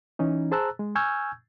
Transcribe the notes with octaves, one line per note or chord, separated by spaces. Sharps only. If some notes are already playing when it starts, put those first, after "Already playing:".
E3 C#4 D#4
G#4 C5 A5 A#5 E6 F#6
G#3
G#5 C#6 E6 F6 G6 G#6